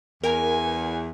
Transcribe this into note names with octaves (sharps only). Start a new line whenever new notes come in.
E2 A#4 G#5